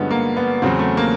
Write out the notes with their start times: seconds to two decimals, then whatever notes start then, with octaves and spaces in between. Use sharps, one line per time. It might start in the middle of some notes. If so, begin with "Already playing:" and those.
Already playing: G2 D3 F3 G#3 B3 C#4
0.10 A#3
0.37 B3
0.62 E2 C#3 F#3 C4
0.79 A3
0.97 A#3